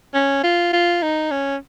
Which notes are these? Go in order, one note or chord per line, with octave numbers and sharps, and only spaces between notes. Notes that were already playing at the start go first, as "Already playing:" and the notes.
C#4
F4
F4
D#4
C#4